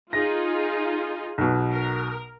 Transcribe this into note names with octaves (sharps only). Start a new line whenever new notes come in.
D#4 F4 G#4 A#6
B1 B2
A#4